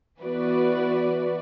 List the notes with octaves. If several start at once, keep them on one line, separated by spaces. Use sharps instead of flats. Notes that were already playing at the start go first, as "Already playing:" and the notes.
E3 B3 F#4 B4 D5